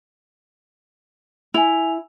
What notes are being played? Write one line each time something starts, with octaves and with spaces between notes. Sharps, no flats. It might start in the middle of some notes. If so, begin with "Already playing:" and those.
E4 G#5 F7